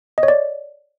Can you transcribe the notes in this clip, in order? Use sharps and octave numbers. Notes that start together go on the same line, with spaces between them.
D#5
C#5
D5